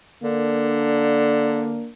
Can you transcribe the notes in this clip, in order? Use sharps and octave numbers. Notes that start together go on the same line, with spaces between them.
D3 A#3 D4